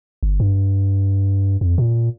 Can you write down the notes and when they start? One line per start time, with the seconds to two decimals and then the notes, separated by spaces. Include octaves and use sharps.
0.23 G1
0.40 G2
1.61 F2
1.78 A#2